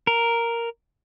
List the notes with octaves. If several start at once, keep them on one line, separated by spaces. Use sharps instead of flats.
A#4